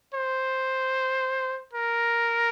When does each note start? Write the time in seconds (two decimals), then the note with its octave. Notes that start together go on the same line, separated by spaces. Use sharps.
0.14 C5
1.73 A#4